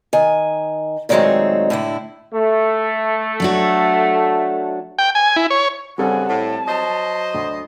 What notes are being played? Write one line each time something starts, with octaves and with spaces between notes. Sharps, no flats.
D#3 G#5
A#2 D#3 F#3 G#3 A3 C4
A2 D3 E4
A3
F#3 D4 F#4
G5
G#5
E4
C#5
G2 C#3 G3 C4 A4 F#5 G#5
A2 A5
F#3 C5 D#5
D2